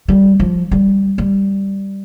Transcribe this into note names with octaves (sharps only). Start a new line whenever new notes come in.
G3
F3
G3
G3